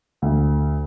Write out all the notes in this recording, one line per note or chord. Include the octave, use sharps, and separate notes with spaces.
D2